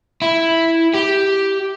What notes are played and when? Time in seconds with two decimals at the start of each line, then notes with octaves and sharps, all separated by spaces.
0.22 E4
0.94 G4